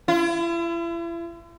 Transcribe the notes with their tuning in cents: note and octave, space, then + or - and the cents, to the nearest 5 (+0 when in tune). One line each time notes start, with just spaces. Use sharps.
E4 +40